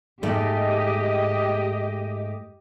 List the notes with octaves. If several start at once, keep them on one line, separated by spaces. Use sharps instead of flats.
G#2 A3 G4 D#5